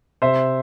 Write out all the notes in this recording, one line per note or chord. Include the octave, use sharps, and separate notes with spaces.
C3 C5 E5